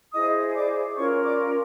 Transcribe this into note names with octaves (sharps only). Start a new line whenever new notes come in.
E4 G#4 C5 D#5 D#6
D5 D6
C#4 F4 A#4 C#5 C#6
D5 D6